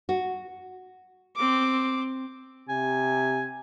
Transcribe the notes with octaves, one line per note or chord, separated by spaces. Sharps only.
F#4
C4 D6
C3 G#5